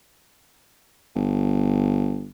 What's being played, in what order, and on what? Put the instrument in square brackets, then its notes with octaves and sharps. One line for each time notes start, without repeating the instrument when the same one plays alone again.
[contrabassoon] G1